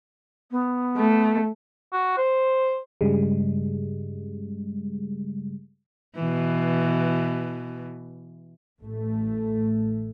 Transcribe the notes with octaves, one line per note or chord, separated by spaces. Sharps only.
B3
A3
F#4
C5
G2 C#3 G3 G#3
B2 E3
A1 A3